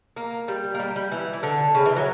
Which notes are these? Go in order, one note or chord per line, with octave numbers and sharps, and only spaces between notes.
A#3
G3
A#3
G3
G3
E3
E3
D3
C#3
E3
F#3